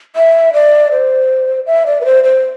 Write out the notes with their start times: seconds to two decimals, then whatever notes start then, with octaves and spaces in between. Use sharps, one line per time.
0.16 E5
0.54 D5
0.92 C5
1.66 E5
1.87 D5
2.01 B4
2.05 C5
2.24 C5